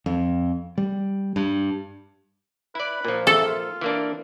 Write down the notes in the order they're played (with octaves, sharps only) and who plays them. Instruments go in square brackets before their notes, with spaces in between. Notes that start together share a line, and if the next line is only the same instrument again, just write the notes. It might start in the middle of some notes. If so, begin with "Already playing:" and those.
[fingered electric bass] F2
G3
G2
[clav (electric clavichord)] E4 D5 [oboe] B4
[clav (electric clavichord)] A#2 F3
[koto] A4 [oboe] E5
[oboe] F4
[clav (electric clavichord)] E3 A#3 D4